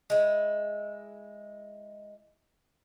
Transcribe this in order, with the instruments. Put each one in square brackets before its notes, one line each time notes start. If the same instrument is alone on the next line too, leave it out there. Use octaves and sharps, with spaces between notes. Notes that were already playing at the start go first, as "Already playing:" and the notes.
[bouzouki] G#3 E4